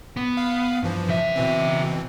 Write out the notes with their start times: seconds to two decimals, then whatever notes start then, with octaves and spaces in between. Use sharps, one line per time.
0.17 B3
0.37 F5
0.83 G2 E3 F3
1.08 C#3 E5
1.36 B2 E3 C4